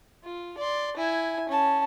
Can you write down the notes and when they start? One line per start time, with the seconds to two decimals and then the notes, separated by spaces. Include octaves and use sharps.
0.24 F4
0.58 D5 C6
0.97 E4 G#5
1.49 C#4 A5